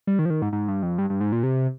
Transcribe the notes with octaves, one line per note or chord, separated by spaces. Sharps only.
G3
D#3
F3
D#3
G#2
G#2
G2
F2
G2
G2
G#2
A#2
C3